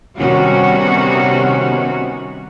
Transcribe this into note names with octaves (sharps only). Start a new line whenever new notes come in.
C3 D#3 G3 B3 C#4 F#4